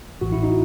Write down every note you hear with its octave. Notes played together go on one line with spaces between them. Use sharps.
A1 A2 E3 F#4
E4
D#4